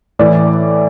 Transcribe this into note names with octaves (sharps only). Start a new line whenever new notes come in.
A2 E3 D5